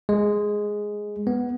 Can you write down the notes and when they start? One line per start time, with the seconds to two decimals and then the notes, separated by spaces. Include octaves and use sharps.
0.09 G#3
1.27 B3